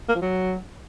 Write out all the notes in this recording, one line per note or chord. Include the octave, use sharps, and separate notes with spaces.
A#3
F3
F#3